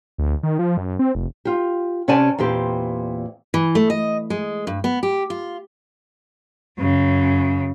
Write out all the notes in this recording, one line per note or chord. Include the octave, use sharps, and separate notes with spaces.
D2
D#3
F3
F#2
C4
F1
F4 G4
C3 C#4 G4 D5 G#5 A5
E2 A#2 C4 G4
E3
A3
D#5
G#3
G2
B3
G4
F4
F#2 C#3